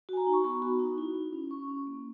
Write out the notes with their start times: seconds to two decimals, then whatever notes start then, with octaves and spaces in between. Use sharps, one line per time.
0.09 F#4 G#5
0.17 A#5
0.27 D#4
0.33 C#6
0.44 B3 B5
0.62 F#4
0.79 D#4
0.98 E4
1.15 E4
1.33 C#4
1.51 C#4 C#6
1.68 C#4
1.87 A#3